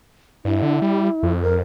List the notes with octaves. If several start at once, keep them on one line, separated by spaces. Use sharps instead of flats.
G2 E4
D3
G3
F2
A#4